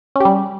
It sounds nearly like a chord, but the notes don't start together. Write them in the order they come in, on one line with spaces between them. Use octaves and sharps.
C#4 G4 G3